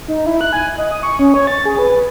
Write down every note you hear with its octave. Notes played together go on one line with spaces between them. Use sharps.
D#4
E4
F#6
G#5
D#5
D#6
C#6
C#4
C#5
A6
G#4
B4